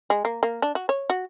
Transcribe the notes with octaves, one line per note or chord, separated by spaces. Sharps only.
G#3
A#3
A#3
D4
F#4
C#5
F#4